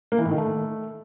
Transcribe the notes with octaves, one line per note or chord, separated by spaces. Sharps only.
A#3
E3
A2
D#3
A3